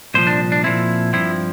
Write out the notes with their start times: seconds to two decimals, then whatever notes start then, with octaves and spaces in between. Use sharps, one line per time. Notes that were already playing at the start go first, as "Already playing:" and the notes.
0.14 C2 A#2 F3 C5
0.27 D4
0.52 D4
0.64 A#2 F3 C4 E4
1.13 G2 F3 C4 E4